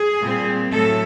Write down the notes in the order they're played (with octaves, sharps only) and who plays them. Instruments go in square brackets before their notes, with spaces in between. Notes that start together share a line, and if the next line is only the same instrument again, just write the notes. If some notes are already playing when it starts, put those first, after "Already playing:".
Already playing: [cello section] G#4
A#2 G3 C4
A2 F#3 A4